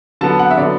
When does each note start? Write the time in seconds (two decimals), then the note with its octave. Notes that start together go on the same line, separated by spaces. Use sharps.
0.21 D3 F#3 B3 A5
0.39 F#5
0.51 E5
0.58 D3 F#3 B3 D5